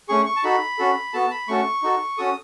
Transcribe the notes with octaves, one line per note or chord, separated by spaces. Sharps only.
A3 C#4 G#4 C#6
C#6
A5
D#4 F#4 A4 B5
C#4 F#4 A4
B3 F#4 A4 A5
B5
A3 C#4 F#4 A4 C#6
D#4 F#4 A4
C#4 F#4 A4 D#6